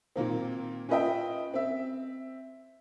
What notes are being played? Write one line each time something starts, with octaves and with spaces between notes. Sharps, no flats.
A#2 D#3 A#3 C4
C#4 F4 B4 D#5 E5 G5
C4 E5